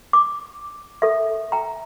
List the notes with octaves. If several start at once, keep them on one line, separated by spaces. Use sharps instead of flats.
D6
A4 E5
G5 A#5